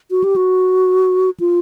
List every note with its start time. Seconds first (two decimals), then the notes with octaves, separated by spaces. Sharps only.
0.11 F#4
0.24 G4
0.36 F#4
1.40 F4